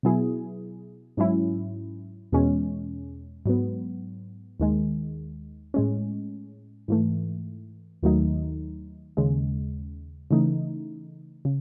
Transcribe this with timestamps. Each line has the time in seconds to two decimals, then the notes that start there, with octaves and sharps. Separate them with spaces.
0.03 B2 F#3 B3 E4 G#4
1.17 G#2 F#3 C#4 E4
2.32 E2 B2 G#3 C#4
3.46 G#2 F#3 B3
4.60 D#2 D#3 G#3
5.74 A2 G#3 C#4
6.88 G#2 E3 A3
8.02 D#2 D#3 F#3 A3 D#4
9.17 D#2 C#3 G#3
10.31 C#3 E3 A3 D#4
11.45 C#3